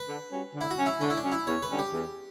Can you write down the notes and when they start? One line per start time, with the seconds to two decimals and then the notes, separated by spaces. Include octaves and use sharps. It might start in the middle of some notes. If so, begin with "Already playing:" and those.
Already playing: B4
0.08 D3
0.33 G3 C#4 F#4
0.55 D3
0.61 E4
0.71 F#4
0.78 F#3 C#4
0.86 E4
1.01 D3 C#4
1.10 E4
1.17 D4
1.24 F#3 C#4
1.32 E4
1.47 E2 C#5
1.63 B4
1.70 D3 G3 C#4
1.79 G4
1.93 E2